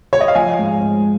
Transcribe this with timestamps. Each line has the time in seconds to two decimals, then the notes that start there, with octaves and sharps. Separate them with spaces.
0.13 C#5
0.21 D#5
0.28 F5
0.35 F3 G#5
0.59 G#2
0.81 G#2